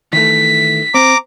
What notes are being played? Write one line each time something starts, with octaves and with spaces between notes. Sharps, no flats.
D#3 E3 A3 B6
C4 A#5 D6